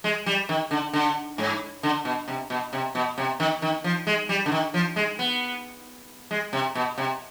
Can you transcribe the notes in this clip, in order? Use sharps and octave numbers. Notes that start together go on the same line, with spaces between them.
G#3
G3
D#3
D3
D3
G#2
D3
B2
C3
B2
C3
B2
C3
D#3
D#3
F3
G#3
G3
D3
D#3
F3
G#3
B3
G#3
C3
B2
C3